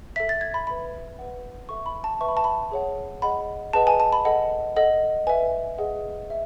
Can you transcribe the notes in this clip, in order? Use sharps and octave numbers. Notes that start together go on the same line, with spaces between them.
A4 E5 B6
A6
G#6
B5
B4 E5 B5
B4 F#5
A4 E5 C#6
B5
A5
B4 E5 C#6
B5
A5
B5
G#4 C#5 F#5
G#4 D#5 F#5 B5
G#4 B4 D#5 F#5 A5
G#5
A5
B5
A4 D#5 F#5
A4 D#5 F#5
B4 E5 G#5
G#4 D#5 F#5
E5